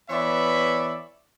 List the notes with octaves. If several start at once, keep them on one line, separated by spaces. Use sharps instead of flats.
E3 B3 C#5 D5 E5 B5